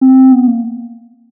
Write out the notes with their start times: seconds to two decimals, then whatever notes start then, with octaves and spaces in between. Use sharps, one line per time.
0.01 C4
0.32 B3
0.47 A#3